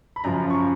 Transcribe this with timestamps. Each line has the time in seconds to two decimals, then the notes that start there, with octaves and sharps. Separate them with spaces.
0.16 B5
0.24 F#2 C#3 F3 A#5
0.50 C#6